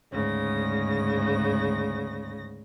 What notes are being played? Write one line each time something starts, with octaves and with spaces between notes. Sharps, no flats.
D2 G#2 C#3 A#6